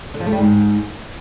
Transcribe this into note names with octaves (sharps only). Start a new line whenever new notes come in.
D3
F3
A3
G3
G#2